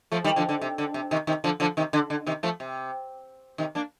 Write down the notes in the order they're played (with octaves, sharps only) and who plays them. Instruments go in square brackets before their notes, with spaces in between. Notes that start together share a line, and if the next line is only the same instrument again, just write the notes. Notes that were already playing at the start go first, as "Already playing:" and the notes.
[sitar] F3 A3
D#3 G3
D3 F3
D3
C3
D3
C3
C3 D#3
C3 D#3
D3 F3
D3 F3
C3 D#3
D3
D3
C3 D#3
F3 A3
C3
C3 D#3
A#3 D4